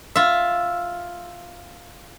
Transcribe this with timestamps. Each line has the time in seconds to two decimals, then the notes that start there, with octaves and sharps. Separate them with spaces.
0.15 F4 E5